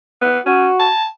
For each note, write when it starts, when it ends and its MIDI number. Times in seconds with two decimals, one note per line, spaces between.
0.22 0.39 59
0.46 0.68 61
0.46 0.89 66
0.80 1.06 81